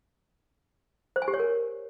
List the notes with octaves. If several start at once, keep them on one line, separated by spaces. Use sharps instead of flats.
C5
G#5
G4
C#5
A#4